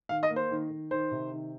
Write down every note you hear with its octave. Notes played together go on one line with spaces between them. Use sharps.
D#3 F5
D#5
A#3
C5
D#3
D#3
D#3 C5
C3
D#3